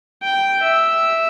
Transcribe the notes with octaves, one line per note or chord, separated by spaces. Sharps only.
G5
E5